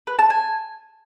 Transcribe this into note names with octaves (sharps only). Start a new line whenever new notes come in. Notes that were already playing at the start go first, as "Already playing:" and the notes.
B4
A5
G#5